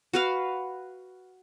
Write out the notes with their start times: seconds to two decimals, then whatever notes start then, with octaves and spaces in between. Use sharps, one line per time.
0.13 F#4 B4 F5